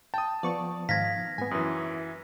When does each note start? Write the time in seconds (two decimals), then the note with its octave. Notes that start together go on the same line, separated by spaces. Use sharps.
0.14 G5 A5 D#6
0.43 F3 B3 D5 C#6
0.89 G#2 D#3 F5 G#6 A#6 B6
1.38 G#2 B3 G#5
1.51 F#2 E3 D#6